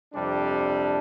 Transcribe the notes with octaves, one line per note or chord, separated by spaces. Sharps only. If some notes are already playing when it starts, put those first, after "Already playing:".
F2 C3 G3 D4